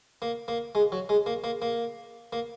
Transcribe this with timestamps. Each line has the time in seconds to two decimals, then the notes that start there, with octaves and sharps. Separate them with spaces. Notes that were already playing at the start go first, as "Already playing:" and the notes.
0.22 A#3
0.48 A#3
0.75 G#3
0.92 F#3
1.09 G#3
1.26 A#3
1.44 A#3
1.62 A#3
2.33 A#3